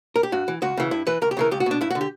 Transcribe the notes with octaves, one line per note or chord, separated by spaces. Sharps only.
A#4
G4
G2 F#4
E3
C#2 F#4
C#3 E3
G2 E4
E3 B4
C#2 A#4
G4
C#3 E3 A#4
C#2 G4
F#4
B2 D4
G2 E4
F#4
D3
G4